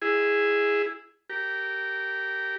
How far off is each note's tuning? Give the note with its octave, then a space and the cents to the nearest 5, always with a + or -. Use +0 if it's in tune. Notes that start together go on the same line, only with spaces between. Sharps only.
E4 +5 G#4 -10
G4 -20 A#4 -15